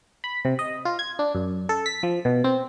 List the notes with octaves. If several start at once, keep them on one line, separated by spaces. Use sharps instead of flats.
B5
C3
D#5
F4
G#6
D4
F#2
A4
B6
F3
B2
C4